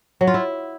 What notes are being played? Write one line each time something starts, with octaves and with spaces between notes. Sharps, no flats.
F#3
F4
E4